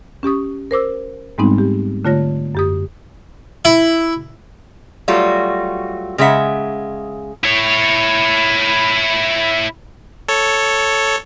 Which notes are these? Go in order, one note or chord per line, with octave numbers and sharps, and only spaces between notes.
C#4 G4 C#6 D#6
A#4 C5 D6 E6
G#2 G3 G#3 B3 C4 D#4
G4
D3 A3 F4 C#5 A#6
F#2 G4 D#6
E4
F#3 G3 A3 F4 F#4
C#3 G#3 B3 E5 F#5
E4 C#5
A4 C#5